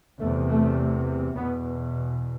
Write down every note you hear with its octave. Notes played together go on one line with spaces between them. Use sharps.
E2 C3 A3
A3
E2 B2 B3